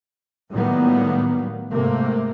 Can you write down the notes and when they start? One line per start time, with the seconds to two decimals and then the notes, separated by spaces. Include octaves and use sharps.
0.51 A2 D#3 F#3 G3 A#3 B3
1.71 G#2 C3 A3 A#3